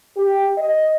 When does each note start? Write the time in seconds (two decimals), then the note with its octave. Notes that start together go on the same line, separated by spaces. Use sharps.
0.17 G4
0.58 D#5